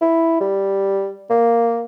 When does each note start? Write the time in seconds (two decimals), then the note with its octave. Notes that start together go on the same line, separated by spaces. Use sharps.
0.02 E4
0.41 G3
1.30 A#3